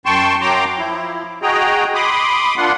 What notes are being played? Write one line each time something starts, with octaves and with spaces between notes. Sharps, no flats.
F#2 G5 A5 C6 C#6
F#2 F#3 G5 A#5 C6 D6
F3 E4
F#4 G#4 D#5 G5 A#5
B5 C6 D6 D#6
A#3 D4 F4 F#5 C6